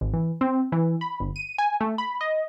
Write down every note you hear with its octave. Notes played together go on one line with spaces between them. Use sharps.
G#1
E3
C4
E3
B5
G1
D#7
G#5
A3
B5
D#5